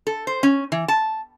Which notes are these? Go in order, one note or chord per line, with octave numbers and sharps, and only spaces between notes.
A4
C5
C#4
E3
A5